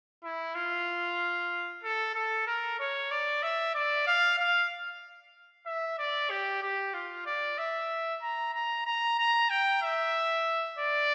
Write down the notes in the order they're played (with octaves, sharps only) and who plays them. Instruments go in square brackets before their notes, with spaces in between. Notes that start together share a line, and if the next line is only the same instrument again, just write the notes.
[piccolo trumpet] E4
F4
A4
A4
A#4
C#5
D5
E5
D5
F5
F5
E5
D5
G4
G4
F4
D5
E5
A#5
A#5
A#5
A#5
G5
E5
D5